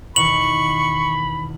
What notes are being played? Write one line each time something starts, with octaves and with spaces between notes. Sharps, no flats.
E2 B2 D#3 B5 C#6 F#7